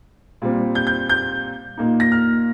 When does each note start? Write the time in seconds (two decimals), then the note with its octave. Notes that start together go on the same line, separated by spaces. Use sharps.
0.42 A#2 G3 C4
0.75 G6
0.87 G6
1.09 G6
1.77 A#2 A#3 D#4
2.00 A#6
2.12 F6